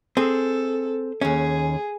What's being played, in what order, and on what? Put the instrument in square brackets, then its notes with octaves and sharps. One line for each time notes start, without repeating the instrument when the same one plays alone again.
[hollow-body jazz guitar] C4 G#4 [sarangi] A4
[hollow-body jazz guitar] D#2 C#4 [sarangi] G#4